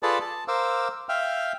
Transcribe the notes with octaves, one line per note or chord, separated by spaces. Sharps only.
F4 G#4 A4 B4 D5 A5
A5
A#4 C5 F5 D6 E6
E5 F5 G5 F6